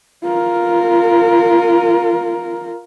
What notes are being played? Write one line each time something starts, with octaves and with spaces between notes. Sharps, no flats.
F4 A#4